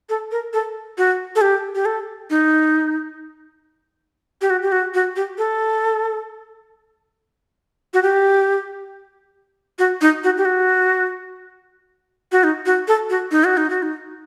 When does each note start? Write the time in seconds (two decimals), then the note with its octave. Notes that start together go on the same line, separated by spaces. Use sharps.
0.09 A4
0.32 A#4
0.53 A4
0.98 F#4
1.36 A4
1.41 G4
1.75 G4
1.86 A4
2.30 D#4
4.41 G4
4.50 F#4
4.63 G4
4.72 F#4
4.94 F#4
5.16 G4
5.38 A4
7.94 F#4
8.03 G4
9.79 F#4
10.01 D#4
10.24 F#4
10.38 G4
10.45 F#4
12.32 F#4
12.44 D#4
12.66 F#4
12.88 A4
13.10 F#4
13.31 D#4
13.44 F#4
13.57 D#4
13.70 F#4
13.82 D#4